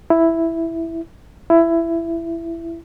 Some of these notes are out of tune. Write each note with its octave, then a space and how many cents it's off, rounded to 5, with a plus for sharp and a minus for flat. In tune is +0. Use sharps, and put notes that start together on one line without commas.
E4 +0
E4 +15